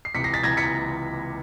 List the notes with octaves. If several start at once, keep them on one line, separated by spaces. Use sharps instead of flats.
C7
C#2 C3 E3 B6 C#7
A#6 C7
A6 B6
C#2 C3 E3 G#6 A#6
B6 C#7